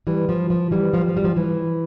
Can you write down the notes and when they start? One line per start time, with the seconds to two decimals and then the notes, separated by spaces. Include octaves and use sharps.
0.07 E3 G3
0.29 F3
0.50 F3
0.71 E3 G3
0.93 F3
1.01 G3
1.09 F3
1.17 G3
1.24 F3
1.37 E3